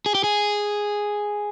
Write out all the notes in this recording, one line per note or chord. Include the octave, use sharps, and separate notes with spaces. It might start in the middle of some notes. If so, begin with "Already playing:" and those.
G#4
G4
G#4